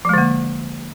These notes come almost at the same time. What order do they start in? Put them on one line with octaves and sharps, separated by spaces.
F3 G#3 D3 A#3